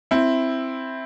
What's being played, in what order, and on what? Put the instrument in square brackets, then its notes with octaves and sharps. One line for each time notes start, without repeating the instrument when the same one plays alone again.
[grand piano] C4 E4